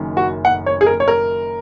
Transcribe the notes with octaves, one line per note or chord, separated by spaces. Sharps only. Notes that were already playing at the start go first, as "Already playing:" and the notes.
Already playing: F#1 F#2 D#3
F#4
F#5
C#5
G#4
A#4
C#5
A#4